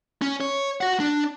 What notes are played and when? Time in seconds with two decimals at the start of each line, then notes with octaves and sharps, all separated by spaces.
0.22 C#4
0.41 C#5
0.81 F#4 F#5
1.00 D4